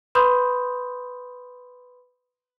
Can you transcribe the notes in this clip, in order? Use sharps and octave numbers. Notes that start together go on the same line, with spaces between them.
B4 B5 C6 D#6 G6